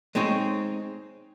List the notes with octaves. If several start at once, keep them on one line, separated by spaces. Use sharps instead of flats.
G#3 C4 D#4 G#4 C#5